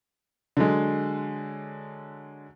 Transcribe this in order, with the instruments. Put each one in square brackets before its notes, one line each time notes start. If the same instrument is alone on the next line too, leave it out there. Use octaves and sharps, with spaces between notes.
[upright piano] D3 F#3 G#3